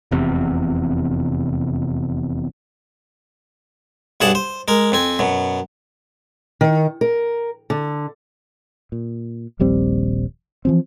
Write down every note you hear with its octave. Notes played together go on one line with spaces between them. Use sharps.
F1 E2 C3
B1 G2 G#4 F#5 A5
C5
G#3 A#4
F2 C4 G#5
F#2 B2
D#3
A#4
D3
A#2
D#1 A#1 G3 C4
E3 F3 C4